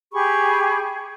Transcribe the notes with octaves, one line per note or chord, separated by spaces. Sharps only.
G4 G#4 B5 C#6